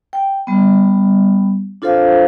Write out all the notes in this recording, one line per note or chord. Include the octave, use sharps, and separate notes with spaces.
G5
G3 B3
D4 F4 A4 C5 F5